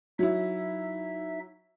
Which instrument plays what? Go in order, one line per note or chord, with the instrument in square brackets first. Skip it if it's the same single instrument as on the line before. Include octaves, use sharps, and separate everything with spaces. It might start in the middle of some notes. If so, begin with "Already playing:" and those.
[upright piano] F#3 E4 [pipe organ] D#4 E5